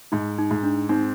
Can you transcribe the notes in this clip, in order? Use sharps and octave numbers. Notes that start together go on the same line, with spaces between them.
G#2 D#4
D#4
G#2
D4
C4 D#4